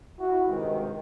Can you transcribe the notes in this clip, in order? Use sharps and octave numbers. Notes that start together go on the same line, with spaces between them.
E4 F#4
G2 C3 D#3 G#3